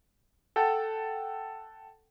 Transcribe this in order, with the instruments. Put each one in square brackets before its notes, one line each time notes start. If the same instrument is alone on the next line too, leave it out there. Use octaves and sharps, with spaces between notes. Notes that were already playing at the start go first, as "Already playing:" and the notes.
[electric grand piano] A4 F#5 G5 A5